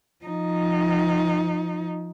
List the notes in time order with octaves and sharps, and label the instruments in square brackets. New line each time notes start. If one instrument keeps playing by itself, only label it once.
[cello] F3 D#4